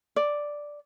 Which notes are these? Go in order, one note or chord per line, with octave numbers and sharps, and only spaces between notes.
D5